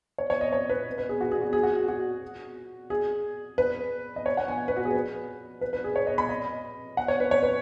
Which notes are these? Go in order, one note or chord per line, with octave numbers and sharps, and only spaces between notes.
C#5
C#5
D#5
C#5
B4
B4
G#4
F#4
G#4
F#4
G#4
F#4
F#4
G#4
B4
D#5
C#5
F#5
G#5
B4
F#4
G#4
B4
B4
B4
G#4
C#5
D#5
B5
D#5
F#5
C#5
B4
C#5
B4